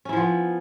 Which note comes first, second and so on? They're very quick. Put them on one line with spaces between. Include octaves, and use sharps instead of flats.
C#4 E4 F3 B3